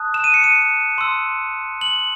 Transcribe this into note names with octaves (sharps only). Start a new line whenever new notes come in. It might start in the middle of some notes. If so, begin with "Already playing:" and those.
Already playing: A5 D#6 F#6
E7
D#7
C#7
D#7
C6 E6
F#7